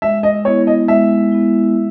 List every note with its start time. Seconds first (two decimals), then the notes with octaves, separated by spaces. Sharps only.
0.02 G#3 E5
0.23 D#5
0.45 B3 E4 C#5
0.67 D#5
0.88 G#3 E5
1.32 B3 E4
1.75 G#3